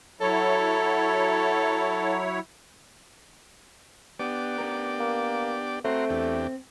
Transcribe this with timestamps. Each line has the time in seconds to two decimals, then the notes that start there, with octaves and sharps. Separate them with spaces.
0.21 F#3 E4 A4 C#5
4.19 B3 D4 G4 D5
4.58 B3 A#4
5.00 A#3
5.85 A3 C4 F#4 A#5 C6
6.10 E2 D4 G4